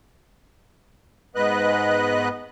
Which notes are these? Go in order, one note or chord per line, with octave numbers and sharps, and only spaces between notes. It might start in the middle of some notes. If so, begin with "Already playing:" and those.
G#2 B3 B4 D#5 F#6